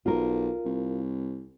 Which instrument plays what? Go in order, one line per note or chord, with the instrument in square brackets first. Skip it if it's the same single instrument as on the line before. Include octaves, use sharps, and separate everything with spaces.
[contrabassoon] B1 [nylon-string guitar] F4 A#4
[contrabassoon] C2